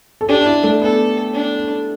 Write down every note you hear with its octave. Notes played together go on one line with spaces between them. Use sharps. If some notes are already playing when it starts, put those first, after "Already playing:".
A4
D4 G4
E4
A3
B3 A4
D4